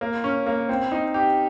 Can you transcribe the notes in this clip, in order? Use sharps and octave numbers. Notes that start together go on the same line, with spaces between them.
A#3
C#4
A#3
C4
D#4
G4